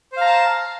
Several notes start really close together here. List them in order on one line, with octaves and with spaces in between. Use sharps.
C5 F5 A#5 A5